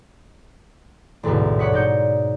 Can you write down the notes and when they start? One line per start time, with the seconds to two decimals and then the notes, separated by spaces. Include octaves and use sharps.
1.23 A1 D2 G#2 B2
1.59 C#5 D5 F#5 C#6 D#6 B6
1.73 G#2 D#4 D5 G6 C#7